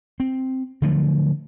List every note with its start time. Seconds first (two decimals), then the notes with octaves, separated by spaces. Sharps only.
0.20 C4
0.82 D3 F3 F#3 A3